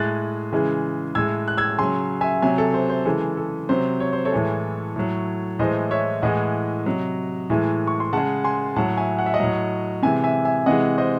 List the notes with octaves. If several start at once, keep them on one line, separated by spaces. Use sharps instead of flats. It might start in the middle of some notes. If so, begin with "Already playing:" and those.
Already playing: A2 G#3 F#6 A6
C#3 E3 G#3
A2 G#3 E6 G#6
F#6
E6 G#6
C#3 F#3 G#5 C6
E5 G#5
C3 F#3 E5 G#5
A4
C5
C5
C#3 E3 G#3 A4
A4
C3 F#3 C5
C#5
C5
A4 C#5
A2 E3 G#3
A2 F#3
A2 E3 G#3 C5 D#5
C#5 E5
A2 E3 G#3 D#5 F#5
C3 F#3
A2 E3 G#3
C#6
C6
C#3 G#3 F#5 A5
G#5 C6
A2 F#3 F#5 A5
E5 G#5
F#5
E5
D#5 F#5
A2 F#3
C3 E3 G#3 E5 G#5
E5 G#5
E5 G#5
C3 E3 G#3 D#5 F#5
C5 D#5